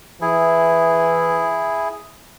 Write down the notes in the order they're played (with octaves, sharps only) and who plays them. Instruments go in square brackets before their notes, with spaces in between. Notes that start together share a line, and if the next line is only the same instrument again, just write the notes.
[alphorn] E3 [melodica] E4 G#4